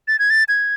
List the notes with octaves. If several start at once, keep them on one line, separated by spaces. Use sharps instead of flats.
A6
G#6
A6
G#6